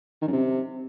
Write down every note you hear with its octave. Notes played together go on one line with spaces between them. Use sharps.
D#3
F#2
C3